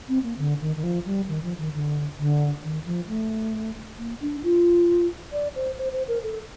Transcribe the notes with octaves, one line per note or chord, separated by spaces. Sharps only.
C4
A#3
D3
D#3
D#3
F3
G3
D#3
F3
D#3
D3
D3
D#3
F3
A3
A#3
D4
F4
D5
C5
C5
C5
A#4
A4